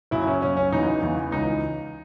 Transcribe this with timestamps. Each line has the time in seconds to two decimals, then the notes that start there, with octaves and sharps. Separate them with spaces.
0.11 F#2 C#3 F#3 E4
0.27 C#4
0.42 F#2 C#3 F#3 C#4
0.57 C#4
0.72 E2 C#3 E3 D#4
1.02 E2 C#3 E3
1.32 C#2 C#3 E3 D#4